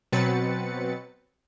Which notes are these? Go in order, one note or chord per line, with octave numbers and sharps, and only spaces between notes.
B2 F#3 C4 B4 A6 C#7